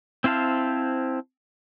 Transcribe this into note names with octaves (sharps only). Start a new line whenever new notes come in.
C4 E4 C5 F5 A5